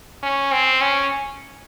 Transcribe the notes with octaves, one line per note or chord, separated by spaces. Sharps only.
C#4
C4
C#4